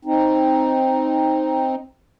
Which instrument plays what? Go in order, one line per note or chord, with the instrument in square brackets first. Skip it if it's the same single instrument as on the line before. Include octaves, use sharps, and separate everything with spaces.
[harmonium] C4 D#4